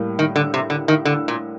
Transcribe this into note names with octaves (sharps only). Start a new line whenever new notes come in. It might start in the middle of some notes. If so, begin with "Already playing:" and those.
Already playing: A2 G3 A#3
D#3
D3
C3
D3
D#3
D3
A#2